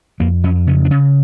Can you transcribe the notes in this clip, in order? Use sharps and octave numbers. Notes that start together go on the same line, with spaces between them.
F2 A#3
F2 C#4
C#3 C#4
D4
C#3 C#4